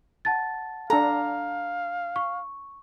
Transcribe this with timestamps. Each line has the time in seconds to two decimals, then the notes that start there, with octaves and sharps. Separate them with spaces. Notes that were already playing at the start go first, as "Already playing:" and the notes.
0.25 F#5 A5 A6
0.90 D4 A4 F5 A#5
2.16 C#6